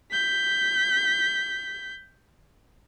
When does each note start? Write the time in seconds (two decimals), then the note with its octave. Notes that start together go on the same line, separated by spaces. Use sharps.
0.12 G6 B6